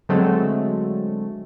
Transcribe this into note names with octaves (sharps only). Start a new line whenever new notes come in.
D3 F#3 G#3 A3 C4